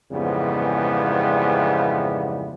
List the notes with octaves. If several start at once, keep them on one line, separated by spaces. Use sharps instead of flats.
F2 G#2 C#3 E3 G3 B3